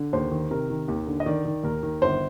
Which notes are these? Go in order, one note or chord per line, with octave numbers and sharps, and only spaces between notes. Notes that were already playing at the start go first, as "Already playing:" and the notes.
Already playing: D3
D#2 C5
D#3
C3 A#4
D#3
D#2
D3
D#5
D#3 D5
D#3
D#2 A#4
D#3
G1 C5